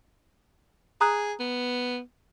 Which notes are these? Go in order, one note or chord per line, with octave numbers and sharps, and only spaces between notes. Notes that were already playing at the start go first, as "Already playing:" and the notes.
G#4 A#5 D#6 F#6
B3